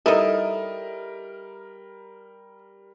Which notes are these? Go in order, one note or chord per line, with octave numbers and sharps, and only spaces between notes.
G3 D#4 E4 A4 A#4 D#5